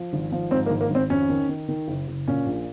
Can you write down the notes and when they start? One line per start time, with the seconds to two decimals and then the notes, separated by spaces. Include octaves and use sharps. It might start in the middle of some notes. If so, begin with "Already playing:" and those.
Already playing: F3
0.13 G#1
0.32 F3
0.51 G#2 C4
0.66 A#3
0.70 G#1
0.81 A#3
0.90 G#1 C4
1.10 F2 C#4
1.29 D#3
1.49 D#3
1.69 D#3
1.88 F#1
2.08 F#1
2.27 A#2 C#4
2.46 A#1